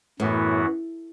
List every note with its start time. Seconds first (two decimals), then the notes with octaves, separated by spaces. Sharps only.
0.20 F#2 A2 E3 B3 F#4